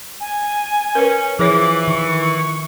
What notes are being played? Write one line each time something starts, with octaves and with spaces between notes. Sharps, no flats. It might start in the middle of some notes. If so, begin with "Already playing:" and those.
G#5
C#4 A#4 B4
E3 F3 G#4 C#5 D6
D#3 C#6